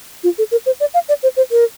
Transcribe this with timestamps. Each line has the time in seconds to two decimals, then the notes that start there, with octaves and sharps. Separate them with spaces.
0.24 F4
0.38 A4
0.52 A#4
0.66 C5
0.80 D5
0.94 F5
1.09 D5
1.23 C5
1.37 C5
1.51 A#4